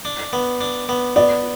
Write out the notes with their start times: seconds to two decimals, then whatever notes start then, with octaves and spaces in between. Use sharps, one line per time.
0.05 D4
0.33 B3
0.61 D4
0.89 B3
1.16 B3 D5